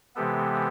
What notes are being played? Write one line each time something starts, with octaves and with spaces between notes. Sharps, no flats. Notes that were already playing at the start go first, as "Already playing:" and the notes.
C3 E3 G#3 B3 G4 A4